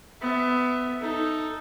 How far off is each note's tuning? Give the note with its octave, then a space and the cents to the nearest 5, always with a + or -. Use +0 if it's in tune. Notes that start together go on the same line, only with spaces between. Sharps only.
B3 +20 E5 +0
D#4 +0 A4 +0